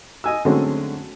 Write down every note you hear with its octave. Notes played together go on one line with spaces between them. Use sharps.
D#5 G#5 E6
D3 F#3 G#3 A3 C4 C#4